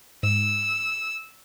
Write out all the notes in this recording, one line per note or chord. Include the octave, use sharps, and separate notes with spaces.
G#2 E6